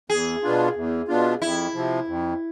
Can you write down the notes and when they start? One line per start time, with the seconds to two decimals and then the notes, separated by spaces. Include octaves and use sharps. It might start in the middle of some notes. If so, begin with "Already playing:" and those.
0.10 E2 G#4
0.43 B2 B3 D4 F4
0.76 E2
1.08 B2 B3 D4 F4
1.41 F2 E4
1.74 C3 F3
2.07 F2